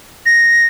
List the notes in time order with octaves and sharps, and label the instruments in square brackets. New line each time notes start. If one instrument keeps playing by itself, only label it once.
[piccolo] A#6